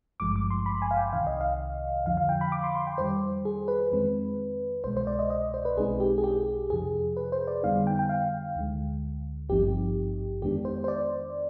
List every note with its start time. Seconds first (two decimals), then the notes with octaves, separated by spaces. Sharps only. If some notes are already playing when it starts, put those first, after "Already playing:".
0.20 G#1 G2 F3 G#3 D6
0.36 D6
0.50 C6
0.66 B5
0.82 G#5
0.91 F5
0.97 G5
1.13 C2 C3 D#3 F5
1.27 D#5
1.41 F5
2.05 F2 D3 F3 F5
2.17 F5
2.29 G5
2.41 B5
2.52 D6
2.63 C6
2.75 C6
2.87 G5
2.98 F2 D#3 G3 C5
3.45 G#4
3.68 B4
3.92 F2 D#3 G#3 C4
4.84 C2 B2 G#3 C5
4.97 C5
5.07 D5
5.19 D#5
5.30 D#5
5.54 C5
5.65 B4
5.77 B1 B2 G#3 C4 D#4 G#4
6.00 G4
6.18 G#4
6.24 G4
6.70 F2 C3 F3 G#4
7.17 B4
7.32 C5
7.47 D5
7.63 F2 D3 G3 B3 D#4 F5
7.87 G5
7.99 G5
8.09 F5
8.56 D2 D3 G#3
9.49 G#1 G2 F3 C4 D#4 G4
10.42 F2 D#3 G#3 B3 D4 G4
10.65 C5
10.84 C5
10.88 D5